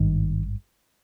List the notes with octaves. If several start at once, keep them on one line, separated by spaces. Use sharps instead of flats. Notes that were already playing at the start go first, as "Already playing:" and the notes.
Already playing: G#1 G2 D#3